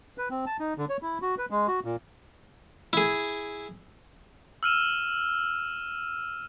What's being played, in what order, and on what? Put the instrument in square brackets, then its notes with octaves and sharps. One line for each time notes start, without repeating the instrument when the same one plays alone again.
[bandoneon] B4
C4
A5
D#4
D3
C#5
E4
F#4
B4
G#3
F#4
A#2
[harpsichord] E4 G#4
[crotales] E6 F6 D#7 E7